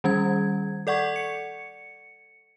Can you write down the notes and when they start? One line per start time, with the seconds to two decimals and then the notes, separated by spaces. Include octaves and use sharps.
0.04 D#3 G3 C#4 G#6
0.87 A4 D5 F#5 C#6 G#6
1.16 C#7